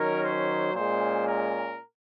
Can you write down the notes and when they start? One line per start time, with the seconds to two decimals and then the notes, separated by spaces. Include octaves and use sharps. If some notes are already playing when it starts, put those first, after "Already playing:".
Already playing: D#3 F#3 C#4 A#4
0.22 C5
0.75 A#2 G#3 C#4 C5
1.28 A#4